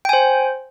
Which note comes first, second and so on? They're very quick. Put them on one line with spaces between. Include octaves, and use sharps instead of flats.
G5 G#5 C5